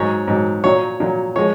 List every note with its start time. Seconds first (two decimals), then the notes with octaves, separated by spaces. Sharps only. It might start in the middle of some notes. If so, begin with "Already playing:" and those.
Already playing: G#2 F#3 C#5
0.28 G#2 F#3
0.64 A#2 F#3 C#5
1.00 A#2 F#3
1.36 F3 G#3 C#5